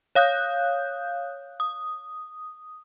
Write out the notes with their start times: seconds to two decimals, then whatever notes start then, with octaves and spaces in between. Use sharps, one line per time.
0.15 C#5 F5 D#6 F#6 G6
1.60 D#6